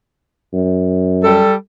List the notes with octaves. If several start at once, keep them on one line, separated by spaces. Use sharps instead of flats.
F#2
G3 A4